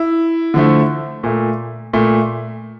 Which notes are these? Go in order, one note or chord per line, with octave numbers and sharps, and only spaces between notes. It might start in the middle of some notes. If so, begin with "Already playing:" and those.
Already playing: E4
D3 F3 A3
A#2 A3
A#2 A3